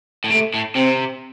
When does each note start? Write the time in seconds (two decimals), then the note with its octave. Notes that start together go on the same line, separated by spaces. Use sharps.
0.24 A2
0.30 C3 A3
0.54 A2
0.76 C3 C4